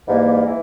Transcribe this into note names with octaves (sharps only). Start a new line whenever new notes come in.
G#2 E3 G3 A#3
E3